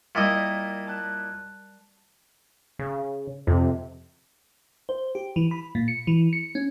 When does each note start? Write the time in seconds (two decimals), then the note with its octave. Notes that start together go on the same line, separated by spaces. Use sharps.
0.15 A#2 G3 E4 A#4 D#5 G5
0.87 A5 F#6
2.79 C#3
3.47 F2 C3
4.89 C5
5.15 G4
5.36 E3
5.51 B5
5.75 A#2
5.88 C#7
6.07 E3
6.33 C#7
6.55 C#4